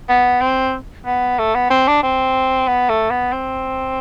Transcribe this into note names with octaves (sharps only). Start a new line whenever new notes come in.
B3
C4
B3
A3
B3
C4
D4
C4
B3
A3
B3
C4